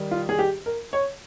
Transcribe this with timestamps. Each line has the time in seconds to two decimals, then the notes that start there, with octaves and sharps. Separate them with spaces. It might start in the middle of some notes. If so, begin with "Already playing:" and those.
Already playing: D#3 G3
0.11 F4
0.29 G#4
0.39 G4
0.66 A#4
0.93 C#5